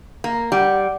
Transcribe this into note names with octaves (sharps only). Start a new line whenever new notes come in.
A#3
G3 F#5